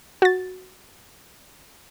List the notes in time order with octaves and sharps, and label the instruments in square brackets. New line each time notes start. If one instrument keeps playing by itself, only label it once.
[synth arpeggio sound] F#4 A6